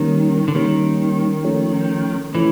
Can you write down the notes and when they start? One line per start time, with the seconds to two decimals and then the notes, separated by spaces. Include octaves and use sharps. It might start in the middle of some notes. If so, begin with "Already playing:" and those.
Already playing: D#3 G3 A#3 C#4
0.48 D3
0.55 D#3 G3 A#3 C#4
1.44 F3 A3 C#4
2.34 E3 F3 A3 C#4